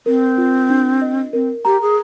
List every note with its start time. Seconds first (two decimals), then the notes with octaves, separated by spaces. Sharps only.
0.06 C4 A#4
0.38 F4
0.69 D4
1.02 D#5
1.33 C4 A#4
1.65 G4 A#5
1.82 G#4